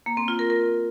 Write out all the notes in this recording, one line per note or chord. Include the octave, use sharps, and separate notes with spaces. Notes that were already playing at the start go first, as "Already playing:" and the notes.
A#3
C4
F4
A#4
A#4